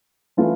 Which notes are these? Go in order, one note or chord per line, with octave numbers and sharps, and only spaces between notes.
E3 A3 C#4 F4